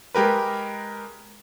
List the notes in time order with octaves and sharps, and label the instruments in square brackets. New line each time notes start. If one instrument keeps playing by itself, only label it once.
[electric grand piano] G#3 G4 A#4 B4